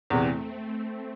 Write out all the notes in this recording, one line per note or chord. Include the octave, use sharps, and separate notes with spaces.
E2 C3 E3 A3 C4